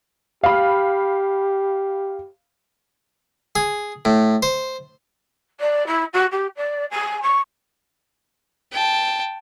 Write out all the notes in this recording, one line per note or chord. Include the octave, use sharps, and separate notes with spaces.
G4 F5 B5
G#4
A2
C5
D5
E4
F#4
G4
D5
G#5
C#6
G5 A5